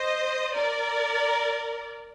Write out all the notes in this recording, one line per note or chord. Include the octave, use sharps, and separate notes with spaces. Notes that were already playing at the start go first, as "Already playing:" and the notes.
Already playing: C5 D#5
A#4 D5